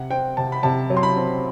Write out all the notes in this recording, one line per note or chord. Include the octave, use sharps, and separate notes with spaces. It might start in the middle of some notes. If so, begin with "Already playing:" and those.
Already playing: C3 F#5
C4 G5
C3 A5
B5
C3 A5
F#3
C6
B5
C4